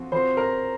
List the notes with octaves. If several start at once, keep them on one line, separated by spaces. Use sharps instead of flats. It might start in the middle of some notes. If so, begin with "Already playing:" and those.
Already playing: F3 C4 F#4
F3 C4 F#4 C5 C6
A#4 A#5